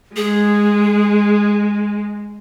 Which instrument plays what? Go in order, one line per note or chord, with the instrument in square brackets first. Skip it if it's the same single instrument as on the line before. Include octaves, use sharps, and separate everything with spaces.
[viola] G#3 [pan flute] G#4